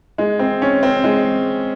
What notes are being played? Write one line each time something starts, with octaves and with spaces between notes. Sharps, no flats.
G#3
C4
C#4
C4
G#3